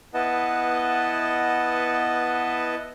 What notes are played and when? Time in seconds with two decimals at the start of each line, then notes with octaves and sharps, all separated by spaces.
0.14 B3 E4 B4 D#5 F#5 A5